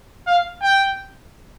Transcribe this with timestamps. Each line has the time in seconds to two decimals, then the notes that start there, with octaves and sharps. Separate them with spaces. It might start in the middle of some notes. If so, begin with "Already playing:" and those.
0.27 F5
0.62 G5